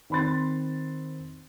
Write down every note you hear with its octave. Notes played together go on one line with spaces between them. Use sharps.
D#3 C4 B5 C6 A6